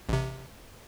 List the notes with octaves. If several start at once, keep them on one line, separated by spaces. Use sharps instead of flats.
A1 C3